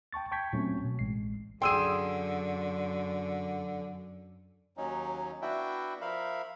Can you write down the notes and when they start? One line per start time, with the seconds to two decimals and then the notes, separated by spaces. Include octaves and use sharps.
0.13 G5 A5 C#6 A6
0.32 G5 A5 C#6 G6 G#6 B6
0.53 A#2 F#3 A3 C4 C#4
0.84 B2
0.99 A1 G#3 C7
1.62 F#2 D3 G#4 G5 C6 E6 D#7
4.77 D#2 F#3 C#4 D#4
5.42 B3 D4 E4 F#4 E5 G5
6.01 F3 A#4 E5 F5 B5